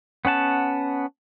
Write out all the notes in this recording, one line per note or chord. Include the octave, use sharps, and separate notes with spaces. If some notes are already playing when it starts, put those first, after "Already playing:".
B3 C#4 F#5 A5